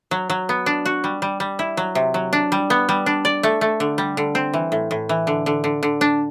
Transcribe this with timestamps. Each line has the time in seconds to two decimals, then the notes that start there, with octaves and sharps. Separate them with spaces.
0.11 F#3
0.30 F#3
0.49 B3
0.66 D4
0.85 F#4
1.04 G3
1.22 G3
1.40 G3
1.59 E4
1.77 F#3
1.95 C3
2.14 F#3
2.33 D4
2.52 G3
2.70 B3
2.89 G3
3.06 D4
3.25 D5
3.43 A3
3.61 A3
3.80 D3
3.98 G3
4.17 D3
4.35 C4
4.54 E3
4.72 A2
4.91 A2
5.09 E3
5.27 D3
5.46 D3
5.64 D3
5.83 D3
6.01 D4